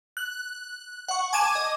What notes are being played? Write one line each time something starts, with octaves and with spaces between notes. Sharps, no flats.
F#6
F#5 C#6
G#5 A5 D6 G#6 D#7 E7
D#5